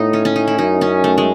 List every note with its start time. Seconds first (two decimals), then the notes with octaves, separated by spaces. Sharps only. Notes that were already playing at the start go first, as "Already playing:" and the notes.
Already playing: A2 A3 B3 D#4
0.13 C#4
0.25 C#4
0.36 D#4
0.48 E4
0.58 F#2 D#4
0.81 C#4
1.04 A3
1.18 G#3